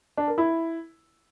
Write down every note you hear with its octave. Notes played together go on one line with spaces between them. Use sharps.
D4
A#4
E4